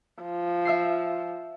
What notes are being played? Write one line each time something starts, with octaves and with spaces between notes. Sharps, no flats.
F3
E5 E6 C7